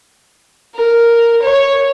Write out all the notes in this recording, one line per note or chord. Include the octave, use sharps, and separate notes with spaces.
A#4
C#5